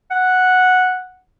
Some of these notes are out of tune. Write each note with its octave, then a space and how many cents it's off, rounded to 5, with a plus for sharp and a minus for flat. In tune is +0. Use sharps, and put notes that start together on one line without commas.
F#5 -5